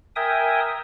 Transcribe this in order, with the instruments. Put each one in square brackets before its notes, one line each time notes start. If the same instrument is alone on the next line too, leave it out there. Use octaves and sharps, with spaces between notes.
[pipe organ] A#4 E5 G5 G#5 D#6